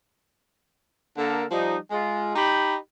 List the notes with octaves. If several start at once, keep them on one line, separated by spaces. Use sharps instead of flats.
D3 A#3 A4 A#4
F3 G3 D#4
G#3 F4
D#4 G4 G5 B5